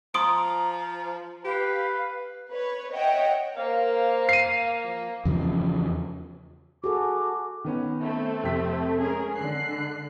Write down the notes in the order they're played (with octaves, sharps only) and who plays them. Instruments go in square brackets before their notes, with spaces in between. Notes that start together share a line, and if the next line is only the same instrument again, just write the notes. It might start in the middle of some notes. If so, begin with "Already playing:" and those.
[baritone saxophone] F3 [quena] A#5 [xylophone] C6 D#6 D7
[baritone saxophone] G4 [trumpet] B4 [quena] F5
[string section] B4 C#5
C#5 D#5 E5 F#5 G5
[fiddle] A#3 [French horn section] A#4 C5 [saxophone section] F5
[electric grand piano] C7 D#7
[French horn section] F3
[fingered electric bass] E2 C#3 F3 C#4
[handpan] F#4 G#4 A4 [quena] D6
[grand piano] D#3 B3 C#4
[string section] A3 C4
[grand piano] F2 C3 B6
[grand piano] G#3 [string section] C#4 G#4 A#4
[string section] D3 F#6 C7